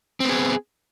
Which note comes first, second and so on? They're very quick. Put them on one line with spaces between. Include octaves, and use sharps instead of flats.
C4 B3 G#4